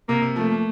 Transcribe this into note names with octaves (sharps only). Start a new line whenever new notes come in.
C3 A#3
C3
F3 A3
A#3